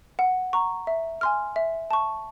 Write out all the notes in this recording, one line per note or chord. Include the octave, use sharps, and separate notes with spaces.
F#5
A#5 C#6
E5
G#5 C6 F6
E5
A5 C#6